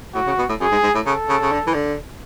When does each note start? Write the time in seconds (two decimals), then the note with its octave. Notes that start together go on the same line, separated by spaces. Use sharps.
0.14 A2 F#4
0.27 C#3
0.38 B2
0.49 A2
0.61 F#2 G#4
0.72 G#2
0.83 G#2
0.94 A2
1.06 C#3 A4
1.29 C#3
1.41 C#3
1.52 D3
1.67 E3
1.74 D3